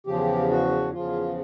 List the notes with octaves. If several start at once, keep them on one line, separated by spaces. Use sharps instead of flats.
E2 C#3 F3 G4
F#4
E2 C#3 F3 F4